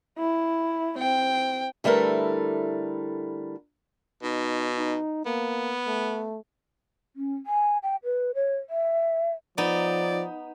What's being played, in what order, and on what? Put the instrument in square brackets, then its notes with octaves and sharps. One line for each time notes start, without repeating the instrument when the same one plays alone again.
[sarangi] E4
[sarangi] C4 [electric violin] G5
[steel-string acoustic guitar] D3 G3 A3 E4 A#4 B4
[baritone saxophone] B2 [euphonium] D#4
[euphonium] D#4
[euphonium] A#3 [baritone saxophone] B3
[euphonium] A3
[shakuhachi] C#4
G#5
G5
B4
C#5
E5
[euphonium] F3 [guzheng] B3 D#4 [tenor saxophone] D5